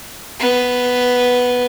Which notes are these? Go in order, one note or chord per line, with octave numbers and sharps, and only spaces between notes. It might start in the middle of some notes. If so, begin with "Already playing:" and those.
B3